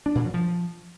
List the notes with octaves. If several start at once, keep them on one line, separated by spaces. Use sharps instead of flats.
D4
A#2
F#3
F3